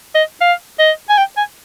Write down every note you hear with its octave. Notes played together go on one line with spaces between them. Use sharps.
D#5
F5
D#5
G#5
G5
G#5